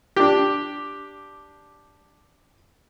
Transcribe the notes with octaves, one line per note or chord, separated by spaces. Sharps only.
D4 G4